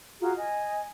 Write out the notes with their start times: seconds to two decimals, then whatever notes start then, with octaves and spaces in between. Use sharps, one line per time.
0.21 F4 F#4 G#4 A#5
0.37 D#5 G#5